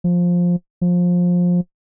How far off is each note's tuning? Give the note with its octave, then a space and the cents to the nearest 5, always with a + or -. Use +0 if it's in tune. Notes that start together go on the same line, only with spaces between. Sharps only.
F3 +10
F3 +20